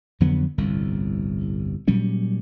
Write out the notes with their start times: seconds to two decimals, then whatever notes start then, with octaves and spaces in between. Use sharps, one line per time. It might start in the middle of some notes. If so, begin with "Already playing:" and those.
0.20 F2 D3 F#3 B3
0.58 G1 C2 A2
1.88 A#2 F#3 G3 C#4